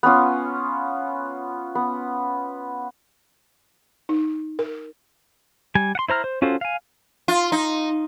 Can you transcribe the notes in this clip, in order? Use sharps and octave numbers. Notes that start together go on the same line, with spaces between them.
B3 C#4 F4
B3
D#4
A#4
G3 G#5
F#5 C6
E4 C5 A#5 F6
C5
C#4 F4 F#4 A4 C5
F5 G#5
F4
D#4